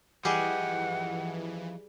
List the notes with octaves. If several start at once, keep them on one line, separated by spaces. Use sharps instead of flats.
E3 F3 G3 G4 G#4 D#5 F#5